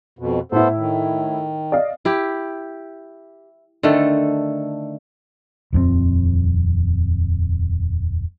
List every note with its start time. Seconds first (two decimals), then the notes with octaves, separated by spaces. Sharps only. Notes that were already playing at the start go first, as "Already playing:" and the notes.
0.19 F2 B2
0.52 A2 B3 E4 A4 C5
0.77 D#3
1.72 D5 D#5 F5
2.05 E4 G4
3.83 D3 D#3 A3 A4
5.73 D#1 F2 F#3 C4